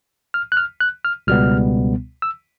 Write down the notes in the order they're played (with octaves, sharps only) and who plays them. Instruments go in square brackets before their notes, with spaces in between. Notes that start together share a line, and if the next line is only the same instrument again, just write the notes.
[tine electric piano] F6
F#6
F6
F#6
F6
C#2 B2 G3 B3 F6
E6